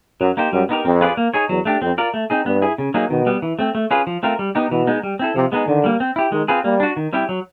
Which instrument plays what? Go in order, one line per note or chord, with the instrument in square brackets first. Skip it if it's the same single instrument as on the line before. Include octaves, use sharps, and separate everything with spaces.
[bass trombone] F#2 [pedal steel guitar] F#3
[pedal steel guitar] A#3 D#4 G4 C5
[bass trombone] F#2 [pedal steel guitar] G3
[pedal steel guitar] B3 D#4 G4 A#4
[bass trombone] F2 [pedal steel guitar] C4
[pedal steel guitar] F4 G#4 B4 D5
A#3
D#4 G#4 C#5
[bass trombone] E2 [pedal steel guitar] F#3
[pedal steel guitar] A3 D4 G4
[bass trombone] F2 [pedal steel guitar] C4
[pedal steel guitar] F4 A#4 D5
A3
C4 D#4 G#4
[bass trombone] G2 [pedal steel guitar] B3
[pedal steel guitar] E4 G#4
C#3
F#3 A#3 D#4 G#4
[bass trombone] B2 [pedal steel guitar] D#3
[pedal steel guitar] G3 B3
E3
A3 C4
A3
C#4 F4 G#4 B4
F3
A3 C4 F4 A#4
G3
B3 D#4 G4
[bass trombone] B2 [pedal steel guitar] E3
[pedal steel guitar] G#3 B3 D#4
G3
C4 E4 A4
[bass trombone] C3 [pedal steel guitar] F3
[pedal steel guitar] G#3 B3 D#4 G#4
[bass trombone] D3 [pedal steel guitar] D#3
[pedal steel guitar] G3 A#3
C4
E4 G4
[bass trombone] D#3 [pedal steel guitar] G#3
[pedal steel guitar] C4 F4 G#4 B4
[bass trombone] G3 [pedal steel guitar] A#3
[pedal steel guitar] D4 F#4
D#3
G3 C4 E4 G4
F#3